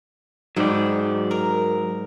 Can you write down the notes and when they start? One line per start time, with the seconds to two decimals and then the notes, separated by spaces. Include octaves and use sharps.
0.57 G#2 F#3 D5
1.31 A#4